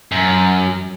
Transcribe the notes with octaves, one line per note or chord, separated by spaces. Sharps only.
F#2